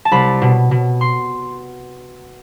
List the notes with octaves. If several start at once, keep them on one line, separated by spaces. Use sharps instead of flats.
A5
C2 B5
B2
B2
C6